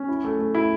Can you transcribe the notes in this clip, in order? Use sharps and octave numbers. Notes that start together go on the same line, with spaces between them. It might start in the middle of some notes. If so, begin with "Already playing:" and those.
Already playing: C#4
E4
A3
A3
E4